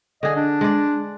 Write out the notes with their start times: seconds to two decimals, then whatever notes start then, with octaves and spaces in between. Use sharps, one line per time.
0.23 D3 G#4 D#5
0.36 D4
0.61 G#3 D5